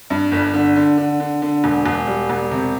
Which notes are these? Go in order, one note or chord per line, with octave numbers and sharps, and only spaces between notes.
G2
G1
D3
D3
D3
D3
D3
E1
E1
G3
E1
C3